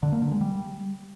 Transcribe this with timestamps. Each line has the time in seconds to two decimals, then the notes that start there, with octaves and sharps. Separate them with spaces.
0.03 D3
0.12 A#3
0.22 D3
0.31 G#3
0.41 G3